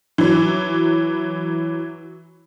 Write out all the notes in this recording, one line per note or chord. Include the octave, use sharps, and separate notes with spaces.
E3 F#3